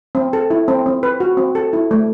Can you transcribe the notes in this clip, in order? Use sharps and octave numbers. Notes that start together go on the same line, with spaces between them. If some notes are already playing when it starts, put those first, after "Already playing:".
C4
A4
E4
C4
C4
B4
F#4
C4
A4
E4
A3